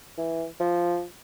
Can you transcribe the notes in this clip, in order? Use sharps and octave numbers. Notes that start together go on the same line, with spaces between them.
E3
F3